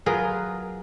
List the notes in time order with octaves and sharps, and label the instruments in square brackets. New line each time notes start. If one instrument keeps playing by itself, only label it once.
[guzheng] F#3 F4 G#4 A#4 B4